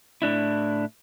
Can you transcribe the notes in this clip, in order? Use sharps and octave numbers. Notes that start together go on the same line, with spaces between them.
A2 D4 E4